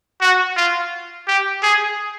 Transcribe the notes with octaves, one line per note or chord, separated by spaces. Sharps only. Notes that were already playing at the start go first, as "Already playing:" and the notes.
F#4
F4
G4
G#4